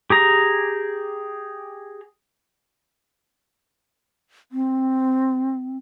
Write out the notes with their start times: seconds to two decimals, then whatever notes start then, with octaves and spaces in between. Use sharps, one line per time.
0.10 G4 G#4 A#5
4.52 C4